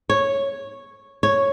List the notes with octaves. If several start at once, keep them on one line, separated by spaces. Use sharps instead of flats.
C#5
C#5